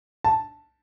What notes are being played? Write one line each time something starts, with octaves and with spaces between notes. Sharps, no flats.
A5